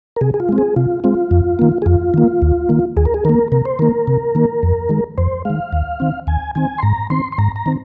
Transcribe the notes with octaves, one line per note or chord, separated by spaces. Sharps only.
A#4
C3 G#4
G#4
F4
G#3 C4
G#4
C3 F4
G#3 C4 F4
F2
D#3 A#3
G#4
F2 F4
D#3 A#3
D#2
D#3 A#3
D#2 G#4
A#4
G#4
D#3 A#3 A#4
C3 A#4
C5
D#3 A#3 A#4
C3
D#3 A#3
F2
D#3 G#3
F2 C5
D#3 G#3 F5
D#2
D#3 C4
D#2 G#5
D#3 C4 G#5
C6
G#2 A#5
D#3 C4 C6
C6
G#2 A#5
A#5
D#3 C4